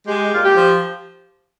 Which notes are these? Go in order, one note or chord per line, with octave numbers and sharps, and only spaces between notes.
G#3 G4
A#2 F4
G4
F3